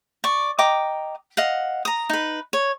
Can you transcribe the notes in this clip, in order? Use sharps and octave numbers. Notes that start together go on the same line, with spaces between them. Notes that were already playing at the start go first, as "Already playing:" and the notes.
D5 C#6
D#5 G5 A#5 D6
D#5 F5 F#5
A#5 D#6
D#4 B4
C#5